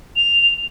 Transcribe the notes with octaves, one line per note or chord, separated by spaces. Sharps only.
F7